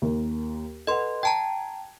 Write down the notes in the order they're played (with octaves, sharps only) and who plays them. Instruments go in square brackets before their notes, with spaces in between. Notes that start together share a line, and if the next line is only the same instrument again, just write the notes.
[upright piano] D#2 A#3 A#4
[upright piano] A4 B4 F#5 [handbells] D#5 C6
[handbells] G5 A5 A#5 [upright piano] G#6